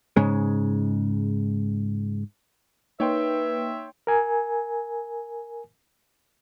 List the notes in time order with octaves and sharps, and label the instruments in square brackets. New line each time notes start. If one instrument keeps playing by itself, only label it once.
[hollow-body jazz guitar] G#2 C#3 G#3
[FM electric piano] A#3 D#4 [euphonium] B4 [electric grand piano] C#5 G5 C6 [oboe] E5
[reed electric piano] A#4 G#5